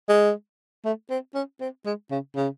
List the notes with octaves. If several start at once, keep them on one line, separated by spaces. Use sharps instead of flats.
G#3
A3
C4
C#4
C4
G#3
C#3
C#3